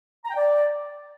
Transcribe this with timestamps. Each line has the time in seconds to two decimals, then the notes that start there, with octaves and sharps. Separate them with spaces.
0.25 A#5
0.31 G5
0.37 D5